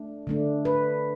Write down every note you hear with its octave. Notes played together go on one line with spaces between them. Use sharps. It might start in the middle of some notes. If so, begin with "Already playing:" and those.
Already playing: A3 D4
D3 A3 D4
B4